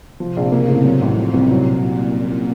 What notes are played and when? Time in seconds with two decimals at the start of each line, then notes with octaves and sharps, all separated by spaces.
0.20 C3 F3
0.37 A#1
0.52 C#3 A#3
0.68 A2
0.85 C3 F#3
1.02 A1
1.17 A2 F3
1.34 C2
1.50 A#2 F#3